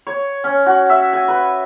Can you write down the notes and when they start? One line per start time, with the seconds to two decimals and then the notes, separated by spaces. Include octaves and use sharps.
0.07 C#5
0.44 C#4
0.66 F#4
0.89 E5
1.13 G#5
1.28 B4